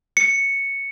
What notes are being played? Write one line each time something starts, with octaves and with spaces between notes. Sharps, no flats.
C#7